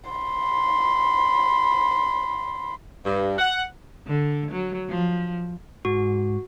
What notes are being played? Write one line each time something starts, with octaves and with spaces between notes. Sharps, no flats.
B5 C6
G2
F#5
D3
F#3
F3
G#2 F#4